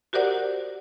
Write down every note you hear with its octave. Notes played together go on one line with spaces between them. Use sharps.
F#4 G4 A#4 C5 D5 F#5